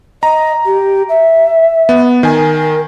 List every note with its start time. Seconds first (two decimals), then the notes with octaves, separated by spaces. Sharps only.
0.23 D#5 A#5
0.65 G4
1.09 E5
1.89 B3
2.23 D#3 A#4 G#5